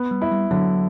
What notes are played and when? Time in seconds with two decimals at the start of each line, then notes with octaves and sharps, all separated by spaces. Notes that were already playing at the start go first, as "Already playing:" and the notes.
Already playing: B3
0.11 G3
0.22 E4
0.32 G3
0.51 D3 F#3